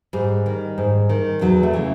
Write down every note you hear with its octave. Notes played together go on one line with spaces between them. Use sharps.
G#2 G3
D#3
G#2
D#3
E2 F#3
A3
C#3 E3